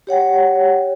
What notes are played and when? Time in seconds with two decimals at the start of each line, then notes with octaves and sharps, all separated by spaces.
0.07 G4 C#5 F#5 G5